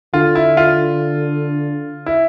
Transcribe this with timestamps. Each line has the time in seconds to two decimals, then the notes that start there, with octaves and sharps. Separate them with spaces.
0.14 D3 F4
0.35 E4
0.57 F4
2.06 E4